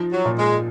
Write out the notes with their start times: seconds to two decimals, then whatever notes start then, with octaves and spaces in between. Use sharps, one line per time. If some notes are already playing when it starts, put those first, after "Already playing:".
Already playing: F3 D#4
0.12 F#3
0.25 A#2
0.38 G#3